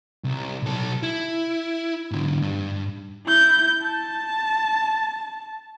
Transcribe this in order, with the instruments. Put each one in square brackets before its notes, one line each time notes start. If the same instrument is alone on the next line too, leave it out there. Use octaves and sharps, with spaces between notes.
[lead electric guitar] C2
B1 A4
E4
G#2 D3
G2
[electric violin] E4 G6
A5